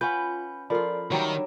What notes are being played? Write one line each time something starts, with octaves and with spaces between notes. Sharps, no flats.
C#4 F4 B4 F#5 B5 G6
F3 F4 A4 A#4 D5 B5
D#3 F#3 G3 C#5 E5